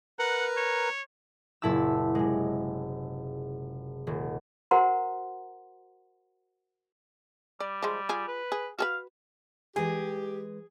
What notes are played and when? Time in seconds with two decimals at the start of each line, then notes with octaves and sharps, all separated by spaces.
0.19 A#4 B4 F#5 A#5
0.57 C#5
1.62 F#1 A#2 E4 A5 E6
2.15 C3 G#3
4.07 D#1
4.71 F#4 A#4 C5 F#5 A#5 C6
7.60 G3 D5
7.83 F3 G#3
8.09 F4 G#4
8.28 B4
8.52 G#4
8.79 F#4 G#4 B4 F5
9.76 E3 G#3 G4 G#4 D#5